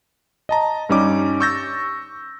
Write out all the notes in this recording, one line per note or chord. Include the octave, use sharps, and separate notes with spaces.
D#5 A5 A#5
G2 G3 C#4 D#4 D6
C#6 E6 G6 A6 A#6